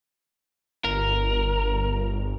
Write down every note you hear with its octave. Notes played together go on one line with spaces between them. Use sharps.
G1 A#4